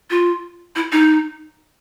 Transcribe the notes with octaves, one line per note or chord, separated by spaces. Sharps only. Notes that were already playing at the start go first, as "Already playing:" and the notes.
F4
E4
D#4